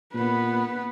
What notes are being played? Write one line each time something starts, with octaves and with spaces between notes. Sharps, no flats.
A#2 B3 B4